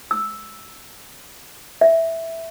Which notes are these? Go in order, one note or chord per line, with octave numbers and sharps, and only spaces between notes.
E6
E5